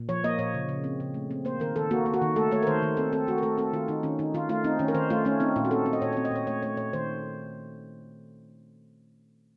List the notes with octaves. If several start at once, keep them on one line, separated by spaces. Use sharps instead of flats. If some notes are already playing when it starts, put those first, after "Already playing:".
Already playing: A#2
F3 C#5
A#3 D#5
A#2 C#5
C#3
C#3
C4
C#3
A3
C4
A#3 C5
D#3 A#4
D#3 A4
A#3 F#4
A#3
F#4
D#3
A3 A4
A3 C#5
A#4
D#3 C5
D#3
C4 A4
C4 A4
A3 F#4
A#4
A3 A4
C4 A4
D#3 F4
D#3 D#4
D#3 C#4
D#3 D#4
D#3 F4
A3 F4
C4 D#4
D#3 C#4
A#4
D#3 C5
A3 F4
A3 C#4
C4 D#4
A#2 F4
F#4
C4 A4
C4
D#5
A#2 C#5
C4 C#5
D#5
A#2 C#5
A3 C#5
A3 C#5
A#2 C#5
D#3 C5